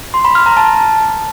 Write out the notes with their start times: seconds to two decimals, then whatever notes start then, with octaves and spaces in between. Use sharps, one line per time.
0.14 C6
0.25 B5
0.35 F6
0.46 A#5
0.57 A5